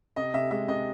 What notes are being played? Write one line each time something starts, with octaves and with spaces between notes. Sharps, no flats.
C3 D#5
C3 E5
G#3 E5
C3 D#5